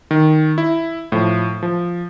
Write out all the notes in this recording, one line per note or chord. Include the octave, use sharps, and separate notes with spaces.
D#3
E4
A2 F3
F3